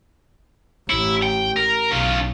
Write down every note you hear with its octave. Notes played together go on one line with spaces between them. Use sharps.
A1 E4
G5
A#4
B1 C#4 F4